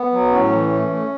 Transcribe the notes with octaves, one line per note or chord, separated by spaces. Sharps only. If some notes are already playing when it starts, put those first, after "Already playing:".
Already playing: B3
F#3
A2 C#4
E3
A3
A3